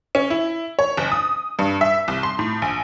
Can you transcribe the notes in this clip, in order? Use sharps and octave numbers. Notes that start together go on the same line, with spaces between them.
C#4
E4
C#5
F#1
D#6
G2
E5
C2
C6
A2
A#1